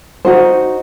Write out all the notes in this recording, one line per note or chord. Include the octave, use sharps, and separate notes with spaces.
D#4 F#4 C5